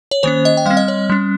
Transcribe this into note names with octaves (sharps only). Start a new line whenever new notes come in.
C#5
D#3 A#3 C#4 C5
D#5
G5
G3 C4 F5
D#5
C#5
G3 C#4